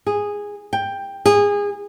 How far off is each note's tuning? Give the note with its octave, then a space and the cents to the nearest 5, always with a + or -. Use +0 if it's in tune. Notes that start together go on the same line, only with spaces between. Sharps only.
G#4 -10
G5 +10
G#4 -25